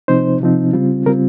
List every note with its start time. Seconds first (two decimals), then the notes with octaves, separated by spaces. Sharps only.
0.08 C3 F3 C4 D#4 C5
0.41 C3 F3 C4 D#4
0.73 C#3 G3 C4 F4
1.06 C#3 G3 C4 F4 A#4